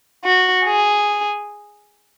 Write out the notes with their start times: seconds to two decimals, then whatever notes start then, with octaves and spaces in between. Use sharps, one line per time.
0.23 F#4
0.65 G#4